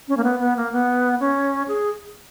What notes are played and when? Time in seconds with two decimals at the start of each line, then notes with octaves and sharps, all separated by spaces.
0.08 C#4
0.17 A#3
0.24 B3
0.40 B3
0.57 A#3
0.72 B3
1.20 C#4
1.68 G#4